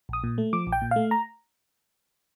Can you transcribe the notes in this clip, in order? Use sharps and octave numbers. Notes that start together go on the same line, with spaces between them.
A#1 D#6
A#2
A3
F3 D6
A#1
G5
A#2
A3 F5
A#5